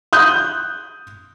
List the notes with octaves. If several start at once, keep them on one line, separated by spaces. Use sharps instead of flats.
D#6 F#6 G6